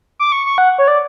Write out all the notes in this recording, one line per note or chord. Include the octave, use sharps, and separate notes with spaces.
D6
C#6
C#6
F#5
C#5
D5